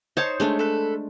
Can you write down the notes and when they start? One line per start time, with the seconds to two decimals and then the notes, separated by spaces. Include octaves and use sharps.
0.17 D#4 C5 C#5 A5 G6
0.40 G#3 A3 D4
0.59 A4 B4